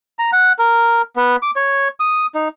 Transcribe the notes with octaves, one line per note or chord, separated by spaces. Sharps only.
A#5
F#5
A#4
B3
D6
C#5
D#6
D#4